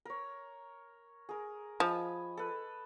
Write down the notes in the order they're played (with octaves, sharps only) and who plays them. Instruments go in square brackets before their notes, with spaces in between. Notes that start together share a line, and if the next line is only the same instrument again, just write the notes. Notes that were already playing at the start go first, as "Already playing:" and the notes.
[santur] A#4 C#5
G#4 A#4
[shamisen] F3 [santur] D#5 G#5 B5
[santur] A4 B4